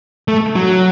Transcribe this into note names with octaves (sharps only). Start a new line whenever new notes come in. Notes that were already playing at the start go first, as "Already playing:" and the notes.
A3
F#3